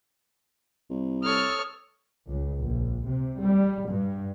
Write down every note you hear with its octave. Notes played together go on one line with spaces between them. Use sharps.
C2
A4 C#5 D#6 F6
C#2
A#1
C3
G3
G2